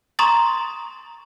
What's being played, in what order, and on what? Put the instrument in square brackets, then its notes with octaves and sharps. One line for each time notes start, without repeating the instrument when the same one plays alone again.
[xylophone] A#5 C6 C#6 D#6 A6